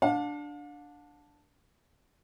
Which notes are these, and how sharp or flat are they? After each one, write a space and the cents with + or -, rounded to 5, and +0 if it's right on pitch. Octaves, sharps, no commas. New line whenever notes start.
D4 +0 F5 +45